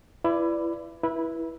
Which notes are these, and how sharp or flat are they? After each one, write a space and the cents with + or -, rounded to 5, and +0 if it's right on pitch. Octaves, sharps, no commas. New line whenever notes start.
E4 +30 B4 +10 D5 +0
E4 +0 B4 -25